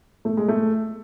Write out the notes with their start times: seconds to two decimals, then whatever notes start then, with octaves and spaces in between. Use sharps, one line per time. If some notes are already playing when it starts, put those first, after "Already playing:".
0.25 A3
0.37 G#3
0.48 A3